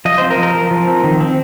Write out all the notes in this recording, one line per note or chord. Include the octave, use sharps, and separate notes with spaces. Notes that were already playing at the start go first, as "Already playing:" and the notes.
F3 D#5
C5
C4
A#4
F3
A#4
F3
F3
C4
D#3
C4